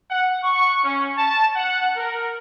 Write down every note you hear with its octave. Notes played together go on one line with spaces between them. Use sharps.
F#5
C#6
C#4
A5
F#5
A#4